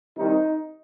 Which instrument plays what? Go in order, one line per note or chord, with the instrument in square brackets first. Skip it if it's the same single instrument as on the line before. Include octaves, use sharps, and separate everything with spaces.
[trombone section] C2 C3 D#3 D#4